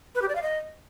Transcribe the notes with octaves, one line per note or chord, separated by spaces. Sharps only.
B4
G4
D5
F5
D#5